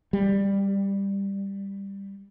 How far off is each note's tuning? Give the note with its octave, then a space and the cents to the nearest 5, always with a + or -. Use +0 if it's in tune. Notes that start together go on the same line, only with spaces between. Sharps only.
G3 +10